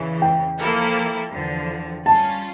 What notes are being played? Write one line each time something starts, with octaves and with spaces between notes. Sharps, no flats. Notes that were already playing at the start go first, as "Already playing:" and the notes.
Already playing: E2 C#3 E3
G5
F3 A#3 E4 A4
E2 D3 F3
G3 C#4 F4 A5